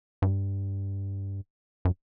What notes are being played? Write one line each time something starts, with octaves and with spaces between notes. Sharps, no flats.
G2
F#2